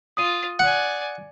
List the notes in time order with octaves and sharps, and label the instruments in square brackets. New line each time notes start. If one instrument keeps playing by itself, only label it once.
[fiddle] F4 [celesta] D#6 D#7
[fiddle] D5 G#5 [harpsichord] F#5